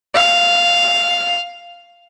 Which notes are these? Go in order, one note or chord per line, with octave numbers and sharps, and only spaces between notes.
F5